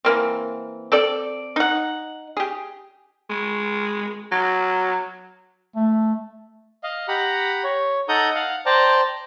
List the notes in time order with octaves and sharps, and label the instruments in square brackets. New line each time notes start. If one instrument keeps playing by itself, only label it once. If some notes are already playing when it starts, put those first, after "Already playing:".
[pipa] E3 A#3 C4
C4 A4 D5
D#4 F#5
G4 G#4
[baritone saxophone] G#3
F#3
[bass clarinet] A3
[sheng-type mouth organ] D#5 F5
G4 F#5 A#5 B5
C#5
D#4 A4 F#5 A#5 D#6 G6
F5 F#5
C5 D5 G5 A5 A#5